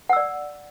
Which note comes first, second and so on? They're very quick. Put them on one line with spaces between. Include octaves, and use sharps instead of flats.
F#5 E6 D5